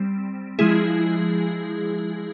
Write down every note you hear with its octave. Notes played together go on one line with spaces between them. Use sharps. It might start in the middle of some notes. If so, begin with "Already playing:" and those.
Already playing: G3 C4
F3 G#3 E4 G#4